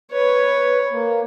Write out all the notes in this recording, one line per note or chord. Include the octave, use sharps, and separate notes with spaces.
B4 C#5
A#3